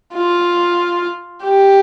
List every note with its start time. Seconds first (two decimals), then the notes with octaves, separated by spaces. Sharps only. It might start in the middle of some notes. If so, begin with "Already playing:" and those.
0.15 F4
1.44 G4